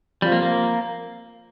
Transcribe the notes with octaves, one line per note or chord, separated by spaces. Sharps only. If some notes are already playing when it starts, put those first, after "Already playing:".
F3 G3 C4 F4 C5 F5
A#3
A#3